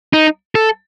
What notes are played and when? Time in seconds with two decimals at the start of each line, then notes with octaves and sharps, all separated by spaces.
0.13 D#4
0.55 A4